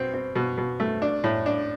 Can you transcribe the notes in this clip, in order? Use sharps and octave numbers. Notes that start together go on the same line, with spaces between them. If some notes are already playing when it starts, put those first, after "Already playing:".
Already playing: B2 C4
C4
B2
B2
A3
D4
A2
D4